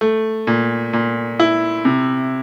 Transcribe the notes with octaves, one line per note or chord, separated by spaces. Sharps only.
A3
A#2
A#2
E4
C3